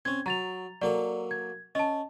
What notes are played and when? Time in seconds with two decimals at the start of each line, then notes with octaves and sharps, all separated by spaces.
0.05 C4 C#4 G#6
0.26 F#3 A#5 A6 F7
0.82 F#3 A#3 A4 D5
1.31 G#6
1.75 C#4 D#5 A5